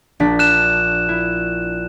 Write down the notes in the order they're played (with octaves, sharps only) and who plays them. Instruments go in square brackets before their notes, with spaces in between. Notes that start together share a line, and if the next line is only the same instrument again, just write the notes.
[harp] A#1 D4 B6
[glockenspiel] F#6 E7
[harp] E4